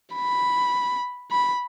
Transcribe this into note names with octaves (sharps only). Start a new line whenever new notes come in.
B5
B5